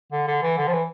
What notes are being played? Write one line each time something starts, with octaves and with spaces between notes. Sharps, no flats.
D3
D3
E3
D3
F3
E3